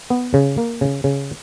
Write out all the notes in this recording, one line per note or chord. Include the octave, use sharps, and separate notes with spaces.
B3
C#3
A#3
C#3
C#3